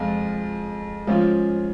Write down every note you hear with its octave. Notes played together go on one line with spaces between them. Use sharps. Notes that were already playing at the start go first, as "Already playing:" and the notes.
Already playing: F2 F3 G#3 F4
G#2 F3 C#4 F4